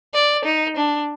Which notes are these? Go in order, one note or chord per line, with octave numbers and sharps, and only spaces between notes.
D5
D#4
D4